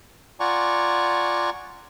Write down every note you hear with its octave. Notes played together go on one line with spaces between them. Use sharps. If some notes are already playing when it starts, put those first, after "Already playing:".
F4 D5 F#5 G#5 A#5 C#6